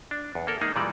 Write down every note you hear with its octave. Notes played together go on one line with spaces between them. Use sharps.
D4
E2
A#3 A4 A#4
G#3 A#3 D#4 G#4
A#2 E3 G3 G#3 D5